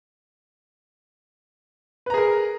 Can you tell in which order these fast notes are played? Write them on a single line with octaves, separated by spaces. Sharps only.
B4 A#5 G#4 A#4